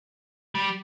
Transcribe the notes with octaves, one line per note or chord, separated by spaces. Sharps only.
G3